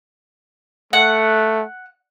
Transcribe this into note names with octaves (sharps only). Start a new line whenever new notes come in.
A3 F#5